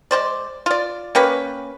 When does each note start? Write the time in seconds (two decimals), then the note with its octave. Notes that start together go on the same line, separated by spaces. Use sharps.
0.11 G#3 C#4 C5 D5
0.66 F4 D5
1.15 A#3 C#4 G4 B4